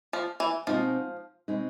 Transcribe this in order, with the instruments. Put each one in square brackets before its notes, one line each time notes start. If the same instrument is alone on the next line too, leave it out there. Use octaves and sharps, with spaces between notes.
[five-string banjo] F3
E3
[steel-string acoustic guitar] B2 G#3 C4 D#4 [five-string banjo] F3
[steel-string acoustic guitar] B2 G#3 C4 D#4